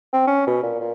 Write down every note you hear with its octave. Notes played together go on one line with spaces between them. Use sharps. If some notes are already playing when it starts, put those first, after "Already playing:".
C4
C#4
B2
A#2
A#2